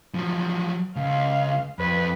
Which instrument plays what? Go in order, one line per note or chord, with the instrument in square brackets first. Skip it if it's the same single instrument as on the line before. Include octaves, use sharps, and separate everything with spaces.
[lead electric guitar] F3 F#3
[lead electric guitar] C#2 [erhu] F5
[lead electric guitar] F2 [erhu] B4